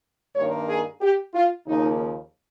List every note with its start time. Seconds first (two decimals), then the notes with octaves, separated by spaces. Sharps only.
0.35 G2 D#3 A#3 C#5
0.68 G#4
1.01 G4
1.34 F4
1.66 D#2 C#3 F3 A#3 D#4